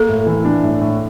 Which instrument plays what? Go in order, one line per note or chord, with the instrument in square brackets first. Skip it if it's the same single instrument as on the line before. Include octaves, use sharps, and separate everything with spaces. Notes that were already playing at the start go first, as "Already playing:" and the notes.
Already playing: [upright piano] A#3 [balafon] A4
[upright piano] A2
E3
D4
A2
A2